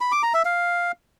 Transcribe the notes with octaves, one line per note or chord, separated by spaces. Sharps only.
B5
D6
A#5
E5
F5